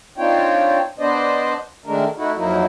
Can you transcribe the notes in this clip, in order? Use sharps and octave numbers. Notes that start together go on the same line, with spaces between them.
C4 D4 D#4 F4 C#5 G5
B3 D4 C5 D5 D#5
D#3 G#3 A3 D4 A#4
A3 D#4 E4 F#4
F2 F#3 A#3 D#4 E4